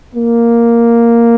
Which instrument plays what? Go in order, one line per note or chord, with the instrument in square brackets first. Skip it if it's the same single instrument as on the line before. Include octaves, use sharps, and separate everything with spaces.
[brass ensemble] A#3